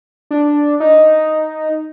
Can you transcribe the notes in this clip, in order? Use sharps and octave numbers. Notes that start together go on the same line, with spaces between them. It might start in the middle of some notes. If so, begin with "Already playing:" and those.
D4
D#4